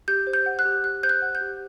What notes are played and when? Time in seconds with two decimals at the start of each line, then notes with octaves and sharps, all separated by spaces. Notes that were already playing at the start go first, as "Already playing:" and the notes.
0.08 G4 G6
0.27 C5
0.33 G6
0.46 F#5
0.59 F#6
0.65 G4
0.84 G4 F#6
1.03 C5 G6
1.09 F#6
1.22 F#5
1.35 G6
1.41 G4